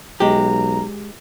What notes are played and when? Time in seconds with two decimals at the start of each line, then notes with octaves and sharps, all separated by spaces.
0.20 B1 G#3 G4 A#5